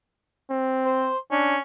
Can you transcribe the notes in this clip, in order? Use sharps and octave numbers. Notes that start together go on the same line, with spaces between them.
C4
C5
C#4 D4